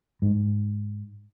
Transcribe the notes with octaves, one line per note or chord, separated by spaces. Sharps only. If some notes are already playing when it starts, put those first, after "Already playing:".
G#2